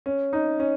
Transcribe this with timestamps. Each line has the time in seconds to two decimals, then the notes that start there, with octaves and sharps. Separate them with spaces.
0.06 C#4
0.33 D#4
0.60 C#4